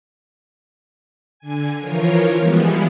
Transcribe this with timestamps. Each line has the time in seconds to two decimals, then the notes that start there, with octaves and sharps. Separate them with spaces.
1.39 D3 G#5
1.79 E3 F3 F4 A#4 C#5
2.37 E3 F3 G3 G#3 B3